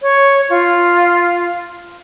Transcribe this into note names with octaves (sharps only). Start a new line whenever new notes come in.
C#5
F4